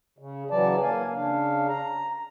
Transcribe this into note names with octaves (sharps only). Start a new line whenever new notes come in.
C#3
C#3 E3 F#3 D5 A5
A#3 F5 G#5
C#3 D4 F5
A#5